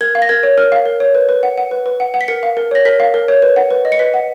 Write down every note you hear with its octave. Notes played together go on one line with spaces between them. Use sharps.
A#4 G#6
F5
A#6
A#4 G#6
C#5
A#4 F6
F5
A#4
C#5
B4
B4
F#5
F#5
B4
B4
F#5
F#5
B6
A#4 C#7
F5
A#4
C#5 A#6
A#4 B6
F5
A#4
C#5
B4
F#5
B4
D#5
C#7
B4 B6
F#5